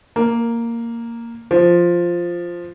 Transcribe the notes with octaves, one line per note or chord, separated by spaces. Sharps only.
A#3
F3